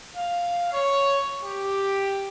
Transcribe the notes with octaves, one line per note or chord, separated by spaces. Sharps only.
F5
C#5
G4